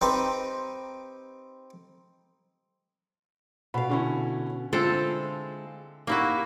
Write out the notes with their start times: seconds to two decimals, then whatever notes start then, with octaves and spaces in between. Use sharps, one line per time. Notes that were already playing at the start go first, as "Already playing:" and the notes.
0.01 C4 D#4 G4 B4 C5
3.74 B2 F5 B5
3.89 D3 C#4 E4
4.73 D3 G#3 C4 E4 F4 A4
6.07 A#3 D#4 E4 F#4 G4